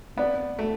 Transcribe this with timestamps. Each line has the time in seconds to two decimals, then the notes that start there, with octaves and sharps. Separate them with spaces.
0.17 B3 C4 G4 D5
0.59 A3